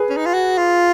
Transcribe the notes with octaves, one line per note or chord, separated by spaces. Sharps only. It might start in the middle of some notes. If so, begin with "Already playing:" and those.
Already playing: G#4 B4
C#4
D#4
F4
F#4
F4